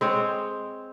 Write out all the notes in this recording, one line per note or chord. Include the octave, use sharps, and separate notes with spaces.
G#3 C4 C5 C#5